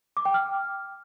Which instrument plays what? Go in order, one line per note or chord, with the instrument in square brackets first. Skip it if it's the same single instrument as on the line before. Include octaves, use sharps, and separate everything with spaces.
[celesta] D6
G5
F6